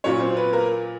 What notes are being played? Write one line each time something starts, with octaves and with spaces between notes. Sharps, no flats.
A#2 F#3 C#4 C#5
C4 C5
B3 B4
A#3 A#4